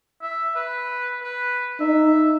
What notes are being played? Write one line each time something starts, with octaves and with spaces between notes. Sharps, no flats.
E5
B4
B4
D#4 E5